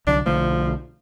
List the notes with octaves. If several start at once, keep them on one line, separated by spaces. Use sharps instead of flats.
C2 D3 F#3 D4
B1 D3 F3 A3